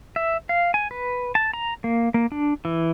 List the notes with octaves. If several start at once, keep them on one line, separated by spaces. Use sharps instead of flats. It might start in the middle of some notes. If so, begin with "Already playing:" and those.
E5
F5
G#5
B4
A5
A#5
A#3
A#3
D4
E3